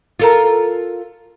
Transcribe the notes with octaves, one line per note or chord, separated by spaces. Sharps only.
F4 A4 A#4